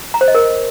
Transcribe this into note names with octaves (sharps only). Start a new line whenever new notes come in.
A#5
C5
D#5
A#4